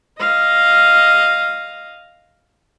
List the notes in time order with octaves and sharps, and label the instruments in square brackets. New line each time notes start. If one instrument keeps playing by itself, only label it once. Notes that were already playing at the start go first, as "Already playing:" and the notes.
[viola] D#5 F5